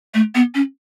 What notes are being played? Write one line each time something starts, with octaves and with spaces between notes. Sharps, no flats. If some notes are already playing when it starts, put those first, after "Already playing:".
A3
B3
C#4